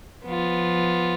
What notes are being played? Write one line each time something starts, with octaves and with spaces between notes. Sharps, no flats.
F3 B3 F4